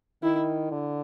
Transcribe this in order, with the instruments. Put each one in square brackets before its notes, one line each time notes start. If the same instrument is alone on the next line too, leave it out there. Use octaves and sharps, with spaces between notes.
[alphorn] D#3 [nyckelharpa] E4
[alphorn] D3